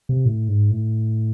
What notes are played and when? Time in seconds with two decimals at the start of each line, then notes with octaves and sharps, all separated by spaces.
0.09 C3
0.25 A2
0.48 G#2
0.71 A2